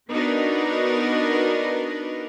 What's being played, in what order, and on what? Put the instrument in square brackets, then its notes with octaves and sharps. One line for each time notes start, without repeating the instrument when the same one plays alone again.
[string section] B3 D4 D#4 F#4 A#4 B4